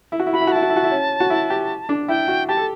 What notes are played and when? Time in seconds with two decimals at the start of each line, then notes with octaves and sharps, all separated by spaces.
0.12 E4
0.20 F#4
0.27 E4
0.33 F#4 B5
0.41 E4
0.47 F#4
0.52 E4 A5
0.62 F#4
0.69 E4
0.76 F#4
0.84 E4
0.91 C#4
1.20 F#4
1.30 E4
1.50 G4
1.89 D4
2.08 E4 G5
2.28 F#4
2.48 G4 A5
2.57 A4